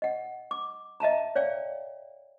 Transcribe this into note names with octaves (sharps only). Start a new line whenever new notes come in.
D#5 F#5
D6
D#5 E5 A5 A#5
C#5 D5 F5 G5